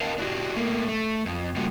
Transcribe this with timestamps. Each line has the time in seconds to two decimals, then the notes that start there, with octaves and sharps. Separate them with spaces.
0.01 A#4 C#5 D#5 F5 G5 A5
0.18 D4 E4 F#4 G4
0.56 A2 A3 A#3
0.88 A3
1.26 F2
1.56 C#3 G3 A3 A#3 F4 F#4